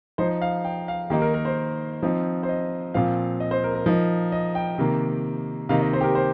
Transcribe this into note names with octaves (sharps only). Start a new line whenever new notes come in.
F3 D#4 C5
F5
G5
F5
D#3 A#3 D#4 G4
A#4
A#4
C5
F3 C4 D#4
C5
D#5
A#2 F3 C4 F5
D#5
C5
A#4
A#4
F3 D#4 A#4
D#5
G5
C3 D#3 A#3
C3 D#3 A#3 D#4 F5
D#5
C5
G4
A#4
C5